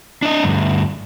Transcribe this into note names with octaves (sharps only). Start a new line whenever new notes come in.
D4 D#5
D2 G2